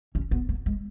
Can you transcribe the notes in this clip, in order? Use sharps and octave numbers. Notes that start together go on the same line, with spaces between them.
C#4
B3
A#3
G#3